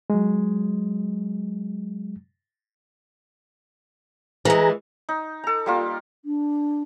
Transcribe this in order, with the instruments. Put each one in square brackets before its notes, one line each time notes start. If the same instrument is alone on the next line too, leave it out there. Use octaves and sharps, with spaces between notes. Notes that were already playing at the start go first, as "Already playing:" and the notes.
[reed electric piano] F#3 G#3
[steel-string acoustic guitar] E3 G#3 [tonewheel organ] G#4 A#5
[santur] D#4
A4 A#5
G3 A#3 F4
[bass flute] D4